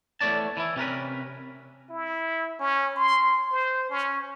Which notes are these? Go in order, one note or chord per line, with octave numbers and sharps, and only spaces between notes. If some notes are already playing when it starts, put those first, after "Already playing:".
E2 A3 C#5 D5 A5
E3 E4
C3 C#4 A#4 B4
E4
C#4
C6
C5
C#4